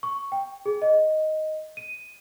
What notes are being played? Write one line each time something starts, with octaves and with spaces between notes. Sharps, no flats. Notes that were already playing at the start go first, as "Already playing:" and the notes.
C#6
G5
G#4
D#5
D#7